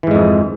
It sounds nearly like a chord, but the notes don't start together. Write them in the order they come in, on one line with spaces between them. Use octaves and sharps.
E3 G#2 G#3 F2